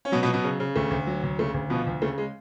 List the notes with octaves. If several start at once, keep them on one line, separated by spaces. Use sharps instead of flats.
C#4
B2 F#3 B3
B2 B3
F#3
B2 B3
C#3
C#3
D2 A3
D2
F#3
D2
C#3 A3
D2
B2 F3 B3
D2
C#3 A3
G#3